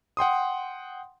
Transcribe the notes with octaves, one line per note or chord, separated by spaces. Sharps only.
F#5 G5 C6 D#6